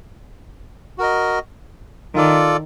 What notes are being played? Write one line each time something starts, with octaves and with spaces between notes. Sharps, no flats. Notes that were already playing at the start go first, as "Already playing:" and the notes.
F#4 A#4 D#5
D#3 F4 A4 D5